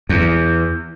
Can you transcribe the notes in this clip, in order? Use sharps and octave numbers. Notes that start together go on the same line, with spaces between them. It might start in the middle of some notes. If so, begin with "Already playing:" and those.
E2